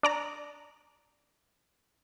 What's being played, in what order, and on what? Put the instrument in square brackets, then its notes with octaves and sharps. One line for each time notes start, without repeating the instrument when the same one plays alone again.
[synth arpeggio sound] D4 D5 A#5